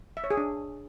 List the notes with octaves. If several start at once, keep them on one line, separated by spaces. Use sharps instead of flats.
E5
C#5
G#4
D4